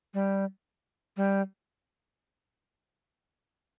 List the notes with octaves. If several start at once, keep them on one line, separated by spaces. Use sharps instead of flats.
G3
G3